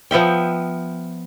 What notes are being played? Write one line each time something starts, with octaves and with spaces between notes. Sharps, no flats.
F3 B3 E5 G5